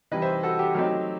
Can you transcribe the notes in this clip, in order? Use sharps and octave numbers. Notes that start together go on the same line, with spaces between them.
C3 E3 G3 D#4 B4 D#5
C5 E5
F#4 A4
G4
F#3 A3 C4 D#4 G4